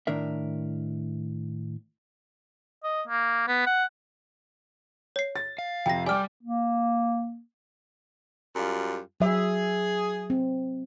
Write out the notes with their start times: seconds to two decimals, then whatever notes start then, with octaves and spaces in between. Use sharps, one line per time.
0.07 A2 D#3 D4 A#4 E5
2.84 D#5
3.07 A#3
3.48 B3
3.66 F#5
5.16 C#5 C7
5.36 A6
5.58 F5
5.86 F2 C3 G5 A#6
6.06 G3 G4 D5 G5 G#5 D6 F6
6.43 A#3
8.56 F#2 G3 F4
9.20 F#3 G#4 E5
10.30 C4